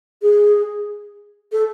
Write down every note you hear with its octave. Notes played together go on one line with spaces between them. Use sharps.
G#4
A4